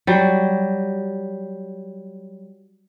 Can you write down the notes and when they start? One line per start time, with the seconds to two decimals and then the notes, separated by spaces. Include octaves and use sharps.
0.07 F#3 G3